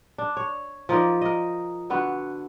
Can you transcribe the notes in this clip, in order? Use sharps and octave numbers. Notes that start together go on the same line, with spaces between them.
D4
C#5
F3 D#4 A#4 D5
A#4 D#5
D3 B3 F#4